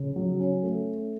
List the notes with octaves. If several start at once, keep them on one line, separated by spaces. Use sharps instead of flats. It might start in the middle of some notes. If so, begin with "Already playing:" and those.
Already playing: C#3
F#3
C#4
A3